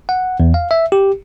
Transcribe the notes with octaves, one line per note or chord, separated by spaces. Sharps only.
F#5
E2
F5
E5
G4